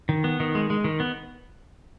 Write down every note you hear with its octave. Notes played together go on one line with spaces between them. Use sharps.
D#3
B3
D#3
G#3
G#3
D#3
B3